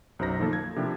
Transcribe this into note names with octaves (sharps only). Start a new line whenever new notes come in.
B1 F#2 D#4 C5 A#5 A#6
D#3 F3 A#3 A4
G#6
C3 F3 A#3 D4 E4 G4